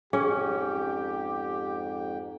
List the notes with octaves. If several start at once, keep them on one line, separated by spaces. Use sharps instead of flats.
F2 G#2 C#4 G4 G#4 G5